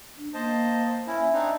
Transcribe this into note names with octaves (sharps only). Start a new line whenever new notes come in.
D4
A#3 C5 D#5 A5
C#4 E4 E5
C4 D4 D#4